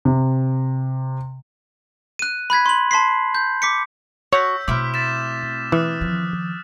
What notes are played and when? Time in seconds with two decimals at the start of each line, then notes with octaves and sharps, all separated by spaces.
0.05 C3
2.19 F#6 D#7
2.50 B5 F#6 G#6 B6
2.66 C6 F#7
2.91 A5 C6 B6 C7
3.35 G6
3.62 D6 B6 C#7
4.33 F#4 C#5 E6 G6 B6
4.68 B2 A3 C4 E4 D6 F6
4.94 A6 B6 E7
5.72 E3 D#6 F6 F#6
6.01 D#3 F3